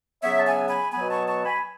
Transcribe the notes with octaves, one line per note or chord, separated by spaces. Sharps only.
C#3 F#3 B3 C#5 E5
A5
E5 G#5
G#5 B5
B2 F#3 B3 G#5 B5
A5 C#6
A5 C#6
G#5 B5